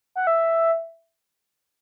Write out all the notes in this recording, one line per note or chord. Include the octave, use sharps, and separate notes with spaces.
F#5
E5